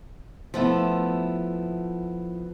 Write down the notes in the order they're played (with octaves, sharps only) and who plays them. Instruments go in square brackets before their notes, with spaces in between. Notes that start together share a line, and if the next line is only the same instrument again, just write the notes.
[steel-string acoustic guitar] F3 A3 B3 E4